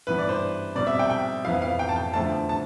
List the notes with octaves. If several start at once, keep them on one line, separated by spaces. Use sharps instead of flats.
G2 E3 B3 B4
D5
C5
B2 G3 C4 D5
E5
G5
G5
F2 E3 B3 F5
F5
G5
A5
G5
E2 D3 F3 A3 A5
A5